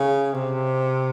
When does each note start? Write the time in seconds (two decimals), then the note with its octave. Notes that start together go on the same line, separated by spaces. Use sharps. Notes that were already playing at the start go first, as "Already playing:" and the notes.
Already playing: C#3
0.34 C3